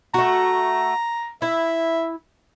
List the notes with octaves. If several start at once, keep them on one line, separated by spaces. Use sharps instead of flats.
A3 F#4 A#5
E4 E5